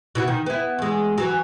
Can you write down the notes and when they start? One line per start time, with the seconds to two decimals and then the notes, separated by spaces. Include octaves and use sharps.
0.15 B2 E4 F#4
0.28 D#3
0.46 B3 E4
0.78 E2 G#3
1.18 E3 F#3